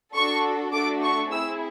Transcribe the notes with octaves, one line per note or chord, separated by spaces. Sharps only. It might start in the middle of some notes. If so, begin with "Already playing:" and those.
D4 F#4 A4 C#6
A3 D4 F#4 A4 D6
C#6
C4 E4 G#4 E6